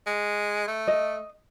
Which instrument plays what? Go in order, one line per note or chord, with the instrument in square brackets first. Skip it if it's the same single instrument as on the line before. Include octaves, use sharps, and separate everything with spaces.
[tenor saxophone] G#3
A3
[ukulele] D#5